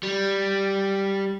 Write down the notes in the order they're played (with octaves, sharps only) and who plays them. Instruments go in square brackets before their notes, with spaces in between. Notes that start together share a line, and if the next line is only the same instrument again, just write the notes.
[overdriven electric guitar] G3